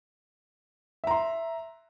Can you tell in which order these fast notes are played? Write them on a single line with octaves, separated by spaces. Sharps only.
E5 A#5 C6